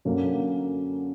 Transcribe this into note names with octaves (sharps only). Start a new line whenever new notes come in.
F#2 D3 F#3 A#3 C#4